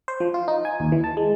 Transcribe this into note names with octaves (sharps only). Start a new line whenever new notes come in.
C5
F3
F4
D#4
G#5
D#2
E3
A5
G#3